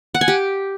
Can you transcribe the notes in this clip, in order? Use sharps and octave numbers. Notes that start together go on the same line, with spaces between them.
F#5
G#5
G4